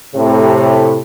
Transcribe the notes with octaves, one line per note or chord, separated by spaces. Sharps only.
A2 C3